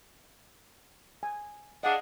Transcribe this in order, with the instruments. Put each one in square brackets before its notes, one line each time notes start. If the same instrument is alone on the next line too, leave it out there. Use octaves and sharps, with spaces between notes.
[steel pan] G#5
[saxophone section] D4 G#4 [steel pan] D#5 F5 [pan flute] F#5